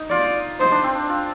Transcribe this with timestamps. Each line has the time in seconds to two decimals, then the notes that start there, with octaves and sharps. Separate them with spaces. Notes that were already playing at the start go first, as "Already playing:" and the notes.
Already playing: D#4
0.10 F4 D5
0.60 D#4 C5
0.72 D4
0.84 C4
0.95 D4
1.10 F4